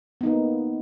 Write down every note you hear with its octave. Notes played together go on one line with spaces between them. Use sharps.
A#3 B3 D#4